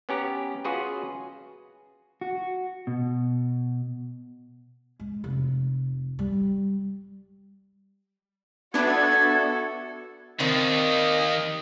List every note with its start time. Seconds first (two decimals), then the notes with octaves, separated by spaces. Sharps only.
0.09 B3 C#4 G4 A#5
0.65 C#4 F4 F#4 G#4 B4
2.21 F#4
2.87 B2
5.00 G#3
5.24 F1
6.19 G3
8.74 B3 D4 F#4 A4 E5 G#6
10.40 D#2 D#3 C4 D5 D#5